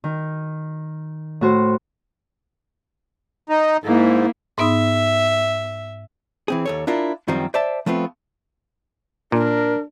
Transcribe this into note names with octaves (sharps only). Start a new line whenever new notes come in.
D#3
A2 F#4 C5
D#4
G#2 A#3 E4
G#2 B3 D#4 E5
E3 C4 G#4
D#2 A4 C#5
D4 E4 F4 A#4
F#2 D#3 F3 G3 C4
C5 D5 E5 A5
F3 A3 B3 C4 F4
A#2 D4 A#4